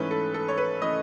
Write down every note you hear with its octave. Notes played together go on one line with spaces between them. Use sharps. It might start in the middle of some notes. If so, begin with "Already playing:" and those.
Already playing: G#2 E3 A3 C#4 B4
A4
A4
C#5
B4
E3 A3 C#4 D#5